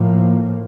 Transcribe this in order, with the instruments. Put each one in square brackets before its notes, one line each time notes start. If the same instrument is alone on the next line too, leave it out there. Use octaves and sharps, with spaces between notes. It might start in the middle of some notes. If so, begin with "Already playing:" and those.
Already playing: [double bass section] A2 F3 A#3